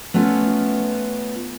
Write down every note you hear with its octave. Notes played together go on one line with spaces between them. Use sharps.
A3 B3 C#4 F4